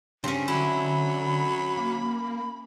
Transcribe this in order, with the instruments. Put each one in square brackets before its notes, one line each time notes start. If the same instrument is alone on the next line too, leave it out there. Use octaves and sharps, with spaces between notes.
[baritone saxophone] G2 [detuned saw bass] C#3 [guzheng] C4 C#4
[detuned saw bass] D3 [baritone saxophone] F#3 [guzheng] E4 [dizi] B5
[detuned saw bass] A#3